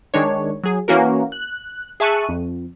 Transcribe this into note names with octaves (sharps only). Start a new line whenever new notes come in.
D#3 G#3 D4 C#5
F#3 G#4
E3 A#3 C#4 F#4 A#4
F#6
G#4 E5 A5 C#6 F#6 D#7
F2